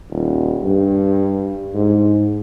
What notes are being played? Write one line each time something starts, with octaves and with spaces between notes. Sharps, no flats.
D#1
G2
G#2